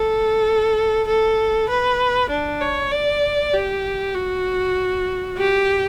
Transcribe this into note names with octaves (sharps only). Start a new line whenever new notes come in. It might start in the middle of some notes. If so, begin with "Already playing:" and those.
Already playing: A4
A4
B4
D4
C#5
D5
G4
F#4
G4